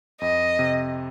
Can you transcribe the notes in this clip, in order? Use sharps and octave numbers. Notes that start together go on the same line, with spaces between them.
F2 D#5
C3